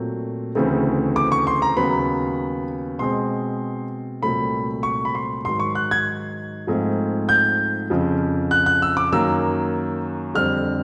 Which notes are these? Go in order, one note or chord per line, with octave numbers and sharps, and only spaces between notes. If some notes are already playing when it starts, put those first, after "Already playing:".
Already playing: A#2 F#3 A3 C4
D2 C#3 E3 A3 C4
D6
C#6
C6
A#5
D#2 C#3 F#3 B3 B5
B2 G#3 C4 C6
C2 A#2 F#3 A3 C4 B5
C#6
B5
C6
G#2 D#3 F#3 C6
C#6
F#6
G#6
G#2 F3 A3 C4
G6
F2 C#3 F3
F#6
F#6
E6
D6
F#2 D#3 F#3 A#3 E6
F2 D3 G3 C4 F6